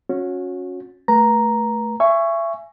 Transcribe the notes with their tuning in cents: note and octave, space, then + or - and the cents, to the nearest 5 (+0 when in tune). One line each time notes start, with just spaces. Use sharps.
C#4 -10 F#4 -30
A3 +0 B4 -40 A#5 +0
E5 +30 G#5 +0 C#6 +0